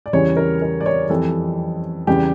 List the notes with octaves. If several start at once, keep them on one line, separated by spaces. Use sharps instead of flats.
D5
E2 C#3 E3 G3 C#5
A#4
A#4
D5
C#5
F2 E3 G3 A4
E2 C#3 G3 G4